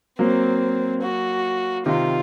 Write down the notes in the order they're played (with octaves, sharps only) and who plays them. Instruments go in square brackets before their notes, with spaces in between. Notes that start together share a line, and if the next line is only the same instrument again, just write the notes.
[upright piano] F#3 A#3 [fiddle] C4
[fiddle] F#4
[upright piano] C3 D#3 [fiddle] F4